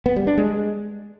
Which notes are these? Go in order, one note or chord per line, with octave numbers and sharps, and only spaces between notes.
B3
G3
D4
G#3